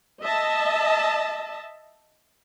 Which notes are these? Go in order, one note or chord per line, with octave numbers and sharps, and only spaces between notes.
D#5 E5 A5